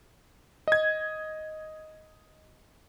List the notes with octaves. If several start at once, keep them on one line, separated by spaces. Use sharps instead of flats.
D#5 G#6